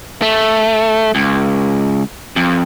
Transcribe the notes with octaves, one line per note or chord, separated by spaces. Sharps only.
A3
C#2
F2